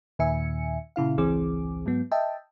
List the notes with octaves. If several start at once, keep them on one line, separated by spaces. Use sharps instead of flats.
D#2 A#2 D#3 E5 G#5 C#7
A#2 C#3 E4 F5
G#1 C#2 E3 C4 G#4 D6
G#2 F#3 B3
D#5 E5 G5 A5